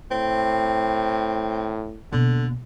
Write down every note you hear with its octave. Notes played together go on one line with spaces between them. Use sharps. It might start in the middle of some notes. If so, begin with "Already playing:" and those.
A2 C4
B2 D3 A#3